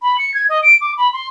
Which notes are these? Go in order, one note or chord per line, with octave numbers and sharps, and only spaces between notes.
B5
C#7
G#6
D#5
D7
D6
B5
C6